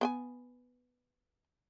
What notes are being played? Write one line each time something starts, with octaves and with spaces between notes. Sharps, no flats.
B3 G5 G#5